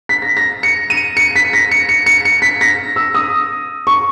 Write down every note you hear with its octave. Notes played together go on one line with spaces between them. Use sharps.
B6
A#6
A#6
C#7
D#7
C#7
B6
A#6
C#7
C#7
C#7
C#7
B6
A#6
E6
D#6
C#6